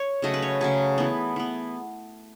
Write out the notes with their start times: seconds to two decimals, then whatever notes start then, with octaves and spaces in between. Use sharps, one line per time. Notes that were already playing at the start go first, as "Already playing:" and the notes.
Already playing: C#5
0.22 C#3 F#3 A3 D#5
0.34 B4
0.42 C#5
0.61 C#3 F#3 A3 G#4
0.98 E3 B3
1.36 E3 B3